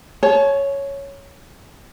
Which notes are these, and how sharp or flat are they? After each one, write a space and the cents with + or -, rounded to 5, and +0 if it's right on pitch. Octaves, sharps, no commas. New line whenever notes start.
C#5 +0 A5 -45